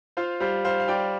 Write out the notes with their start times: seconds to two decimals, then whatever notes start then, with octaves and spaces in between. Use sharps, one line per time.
0.17 F4 C5 F5
0.40 G3 C5 F5
0.65 G3 C5 F5
0.80 F5
0.88 G3 D5 G5